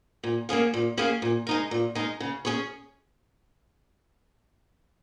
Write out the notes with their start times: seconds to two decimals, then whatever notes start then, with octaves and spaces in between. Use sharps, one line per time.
0.23 A#2
0.49 A#3 C#4 G#4 F5
0.74 A#2
0.97 A#3 C#4 G#4 F5
1.22 A#2
1.47 G#3 D#4 A#4
1.71 A#2
1.95 G#3 D#4 A#4
2.20 C#3
2.45 C#4 G#4 C#5